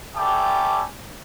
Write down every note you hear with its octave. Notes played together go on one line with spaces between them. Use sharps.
G3 A3 A4 G5 G#5 D6